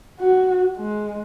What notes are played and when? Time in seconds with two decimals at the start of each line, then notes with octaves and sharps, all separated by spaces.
0.20 F#4
0.77 G#3